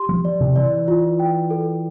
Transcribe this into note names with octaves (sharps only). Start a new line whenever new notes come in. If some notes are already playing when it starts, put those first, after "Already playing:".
Already playing: G4 C6
F3
D5
C3
E3 D5
F4
G5
A4